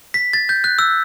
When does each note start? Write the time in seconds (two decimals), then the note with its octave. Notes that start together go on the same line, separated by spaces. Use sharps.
0.14 B6
0.33 A6
0.49 G6
0.64 F#6
0.79 E6